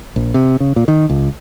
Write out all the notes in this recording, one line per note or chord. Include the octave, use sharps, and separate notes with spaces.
A#1
C3
C#3
A#2
D#3
C#2